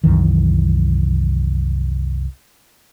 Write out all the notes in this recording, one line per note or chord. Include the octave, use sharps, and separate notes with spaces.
C2 F#2 D#3 E3